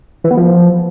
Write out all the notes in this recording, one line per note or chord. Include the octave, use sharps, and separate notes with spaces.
E3
B3
F3